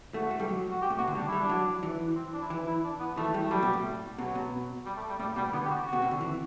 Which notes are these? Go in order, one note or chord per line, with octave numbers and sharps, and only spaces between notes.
A3 F#4
A3
G3
F#3
F#4
G4
A2
B2 F#4
D3
G3 D4
G3 E4
D4
F#3
E3
C4
D4
E4
E3
E4
D4
B3
E3 A3
G3
A3
F#3 G3
B2
A2
B2 F#3
B2
G3
A3
G3
A2 G3
B2 G3
D3 B3
G4
F#4
F#4
B2
C3
D3
E3